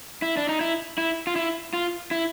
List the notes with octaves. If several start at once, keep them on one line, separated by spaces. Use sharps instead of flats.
E4
D4
D#4
E4
E4
F4
E4
F4
E4